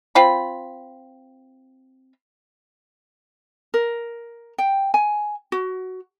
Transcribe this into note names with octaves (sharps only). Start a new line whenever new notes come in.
C4 F4 B5
A#4
G5
G#5
F#4